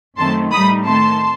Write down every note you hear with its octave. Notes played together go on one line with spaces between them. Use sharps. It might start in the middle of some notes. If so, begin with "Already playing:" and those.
F#2 D#3 A3 C4 A5 C6
A2 G3 D#4 B5 D#6
D#3 A3 C4 A5 C6